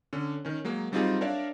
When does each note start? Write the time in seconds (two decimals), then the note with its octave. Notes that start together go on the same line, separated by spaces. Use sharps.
0.13 D3 C#4
0.45 D#3 C#4
0.65 F#3 G#3 A#3
0.92 F#3 G3 C4 D#4 F4 G#4
1.21 D4 A#4 C#5 D5 E5 F5